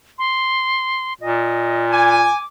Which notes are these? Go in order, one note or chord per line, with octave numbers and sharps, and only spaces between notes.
C6
A#2 D#5
G#5 D6